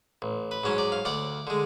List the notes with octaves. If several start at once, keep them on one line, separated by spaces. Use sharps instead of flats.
A1
B4
G#2 F#3 C#4 C#5
D5
F5
D2 D5 F#5
D3 G#3